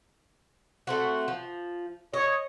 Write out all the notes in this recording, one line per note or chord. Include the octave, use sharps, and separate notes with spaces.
A3 C4 F#4
F3
C#5 D#5